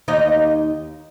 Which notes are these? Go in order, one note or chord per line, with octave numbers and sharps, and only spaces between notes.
D#2 D#4 D#5